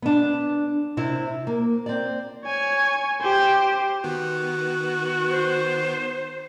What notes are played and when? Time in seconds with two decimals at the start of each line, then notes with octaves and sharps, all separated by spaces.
0.02 B3 D4
0.97 C3 C4 E4
1.47 A#3
1.86 C4 D5
2.45 C#5 G#5
3.22 G4 C5
4.04 D#3 B3 F#4
5.30 C5